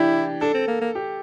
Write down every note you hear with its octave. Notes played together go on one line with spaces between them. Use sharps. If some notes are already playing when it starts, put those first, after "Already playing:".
Already playing: E3 D4 E4 G4
D4 A4
C4
A#3
A#3
G4